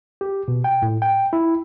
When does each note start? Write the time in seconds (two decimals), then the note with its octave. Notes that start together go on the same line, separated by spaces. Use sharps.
0.21 G4
0.48 B2
0.64 G5
0.82 A2
1.02 G5
1.33 E4